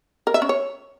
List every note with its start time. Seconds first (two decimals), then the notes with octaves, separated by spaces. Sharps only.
0.27 A#4
0.34 E5
0.42 C#4
0.49 C#5